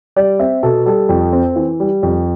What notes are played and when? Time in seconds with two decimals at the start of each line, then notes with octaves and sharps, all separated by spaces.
0.16 G3 D5
0.39 C4 E5
0.63 B2 A4
0.86 G3 A4
1.09 F2
1.33 C4
1.56 E3
1.80 G3
2.03 F2